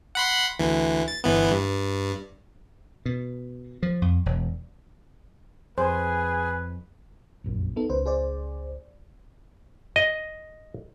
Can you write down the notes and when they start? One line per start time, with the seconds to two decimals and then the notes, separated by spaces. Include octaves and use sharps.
0.15 F#5 B5 C6
0.59 D2 E3
1.08 A6
1.24 G1 E3 B3
1.51 G2
3.06 B2
3.83 F3
4.02 F2
4.26 E1
5.78 F2 G#4 B4 C5
7.44 F1 A#1 F#2
7.76 B3 D#4 A4
7.89 C#2 B4 C5
8.06 G#4 C5 D5
9.96 D#5